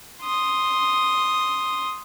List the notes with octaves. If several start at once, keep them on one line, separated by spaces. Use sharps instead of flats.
C6 D#6